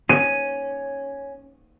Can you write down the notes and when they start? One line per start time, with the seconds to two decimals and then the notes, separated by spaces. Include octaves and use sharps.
0.09 C#4 D#7